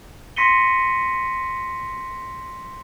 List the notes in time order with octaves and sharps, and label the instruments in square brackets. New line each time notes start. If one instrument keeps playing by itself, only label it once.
[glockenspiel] C6 A#6 B6 C#7 D#7 G7